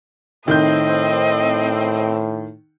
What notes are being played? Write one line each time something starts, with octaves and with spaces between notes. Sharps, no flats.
A2 D#3 C4 D#5 G6